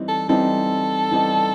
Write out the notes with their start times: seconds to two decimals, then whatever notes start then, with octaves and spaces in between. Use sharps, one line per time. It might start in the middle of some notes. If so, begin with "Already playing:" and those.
Already playing: E3 G3 C4 D#4
0.08 A4
0.29 E3 G3 C4 D#4 A4
1.11 E3 G3 C4 D#4